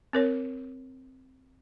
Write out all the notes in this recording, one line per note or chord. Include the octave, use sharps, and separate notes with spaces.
C4 A#4 C#5